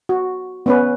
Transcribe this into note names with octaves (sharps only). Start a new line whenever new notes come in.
F#4
B3 C#4 B4